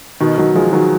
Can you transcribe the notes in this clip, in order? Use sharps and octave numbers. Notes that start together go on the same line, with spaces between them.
B2 D#3
D#3 F#3
F3 G#3
D#3 F#3